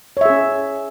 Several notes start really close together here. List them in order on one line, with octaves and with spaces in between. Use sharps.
C#5 E5 G#4 C#4